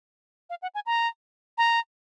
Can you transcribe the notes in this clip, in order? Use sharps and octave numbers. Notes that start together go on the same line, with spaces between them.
F5
F#5
G#5
A#5
A#5